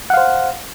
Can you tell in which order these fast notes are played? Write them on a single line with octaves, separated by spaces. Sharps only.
F#5 F5 C5